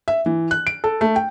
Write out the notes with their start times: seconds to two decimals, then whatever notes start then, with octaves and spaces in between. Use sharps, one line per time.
0.08 E5
0.26 E3
0.51 F#6
0.67 D7
0.84 A4
1.01 A3
1.16 G5